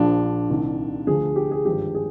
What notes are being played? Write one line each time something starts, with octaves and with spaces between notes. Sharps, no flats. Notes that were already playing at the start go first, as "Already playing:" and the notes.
Already playing: A#1 A#2 F3 D4
C2 C3 D#3
D2 D3 F3 G#4
G4
G#4
G#1 G2 F3 G4
G#4